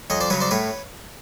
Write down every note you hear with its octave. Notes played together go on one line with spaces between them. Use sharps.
F2 C#5 D#5
C5 D5
C#3 F#3 B4 C#5
C5 D5
A2 B4 C#5